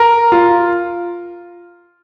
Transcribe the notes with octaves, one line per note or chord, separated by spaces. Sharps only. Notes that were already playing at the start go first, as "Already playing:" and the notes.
Already playing: A#4
F4